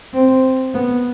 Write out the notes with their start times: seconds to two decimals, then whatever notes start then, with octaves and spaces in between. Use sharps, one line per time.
0.14 C4
0.74 B3